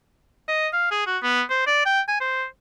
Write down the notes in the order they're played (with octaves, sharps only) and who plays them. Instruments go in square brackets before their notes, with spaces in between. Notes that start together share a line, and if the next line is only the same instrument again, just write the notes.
[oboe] D#5
F5
G#4
F#4
B3
C5
D5
G5
G#5
C5